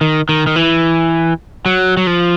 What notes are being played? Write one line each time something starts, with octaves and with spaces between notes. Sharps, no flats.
D#3
D#3
D#3
E3
F#3
F#3
F3